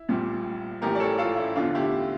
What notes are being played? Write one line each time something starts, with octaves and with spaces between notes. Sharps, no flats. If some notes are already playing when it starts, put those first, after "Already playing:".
Already playing: E4
A#1 A#2 G3
A#1 A2 E3 G4 A#4
D5
A4 C#5
F4 A4
E4
E2 D3 F3 D4 F4
E4 G4